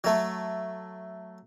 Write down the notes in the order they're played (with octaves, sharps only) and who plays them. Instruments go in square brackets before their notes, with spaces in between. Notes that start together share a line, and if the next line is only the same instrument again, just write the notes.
[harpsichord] F#3 A3